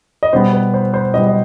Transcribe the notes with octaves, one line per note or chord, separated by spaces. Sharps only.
D#5
B2 G3 B3 C5
B4
C5
C5
B2 G3 B3 D#5
D#5